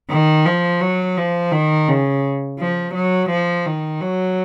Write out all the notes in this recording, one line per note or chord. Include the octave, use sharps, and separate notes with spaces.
D#3
F3
F#3
F3
D#3
C#3
F3
F#3
F3
D#3
F#3